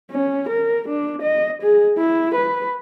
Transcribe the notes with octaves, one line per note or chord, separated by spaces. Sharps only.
C#4
A#4
D4
D#5
G#4
E4
B4